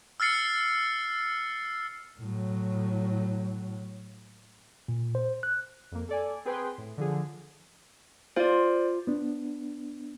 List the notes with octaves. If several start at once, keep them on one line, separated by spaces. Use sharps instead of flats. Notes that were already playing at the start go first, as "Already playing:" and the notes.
E6 F6 A6 C7 C#7
A2 F#3
A#2
C5
F#6
F2 A#3
A4 D5 G#5
C4 G#4 B4 G5 G#5 C6
A2
D3 F3 G#4
F4 C5 D5
B3 D4